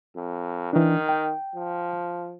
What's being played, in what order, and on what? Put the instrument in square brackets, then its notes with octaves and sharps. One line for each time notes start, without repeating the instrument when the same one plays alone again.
[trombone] F2
[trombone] D#3 [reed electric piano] E3 D4
[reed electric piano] G5
[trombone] F3